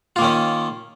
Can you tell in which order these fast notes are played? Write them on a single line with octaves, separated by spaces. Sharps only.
F4 A#3 D#3 C#4